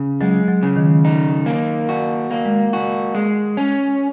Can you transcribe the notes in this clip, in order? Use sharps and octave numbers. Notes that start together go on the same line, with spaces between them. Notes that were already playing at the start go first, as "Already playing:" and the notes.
Already playing: C#3
F#3 G#3
F#3
C#3
D#3
D#4
A#3
F#4
A#3
G#3
F#4
G#3
C#4